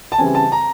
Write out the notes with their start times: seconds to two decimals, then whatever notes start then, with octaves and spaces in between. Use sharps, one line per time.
0.12 A5
0.18 C#3 E3 G3 C4 G#5
0.35 A5
0.52 A#5